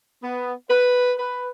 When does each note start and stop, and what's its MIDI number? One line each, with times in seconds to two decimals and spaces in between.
0.23 0.53 59
0.70 1.14 71
1.19 1.50 71